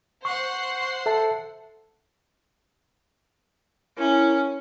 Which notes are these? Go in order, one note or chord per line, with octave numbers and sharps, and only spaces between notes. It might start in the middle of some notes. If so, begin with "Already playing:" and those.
C5 F#5 C#6 C7
A4 E5 A5
C#4 E4 A#4